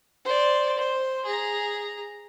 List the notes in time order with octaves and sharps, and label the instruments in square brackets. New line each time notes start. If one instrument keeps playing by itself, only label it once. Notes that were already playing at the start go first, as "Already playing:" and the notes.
[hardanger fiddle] C5 D5
C5
G#4 A#5